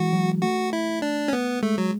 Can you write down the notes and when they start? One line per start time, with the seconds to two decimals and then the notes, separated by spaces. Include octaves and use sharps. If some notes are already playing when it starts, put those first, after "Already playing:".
Already playing: E3 G#3 F#4
0.13 F#3
0.42 A3 F#4
0.73 E4
1.02 D4
1.28 C#4
1.33 B3
1.62 G#3 A3
1.78 F#3